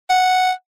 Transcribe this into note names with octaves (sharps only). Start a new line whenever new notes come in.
F#5